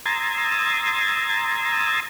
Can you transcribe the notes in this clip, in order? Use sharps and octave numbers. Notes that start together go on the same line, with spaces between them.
A#5 C6 D#6 E6 G#6 A6